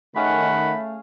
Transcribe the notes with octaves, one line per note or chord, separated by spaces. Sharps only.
D#3 A3 C#4 G#4 F5 F#5 B5